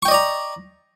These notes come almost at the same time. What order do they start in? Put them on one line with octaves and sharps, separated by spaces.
C#6 G5 D#5 D5 A#5